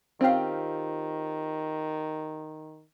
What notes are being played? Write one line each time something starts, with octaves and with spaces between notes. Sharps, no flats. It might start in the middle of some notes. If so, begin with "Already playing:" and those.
D#3 C4 C#4 F4 G4 F5